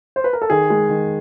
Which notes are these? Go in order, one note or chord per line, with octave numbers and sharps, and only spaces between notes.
C5
B4
A#4
A4
D#3 G#4
G#3
D#3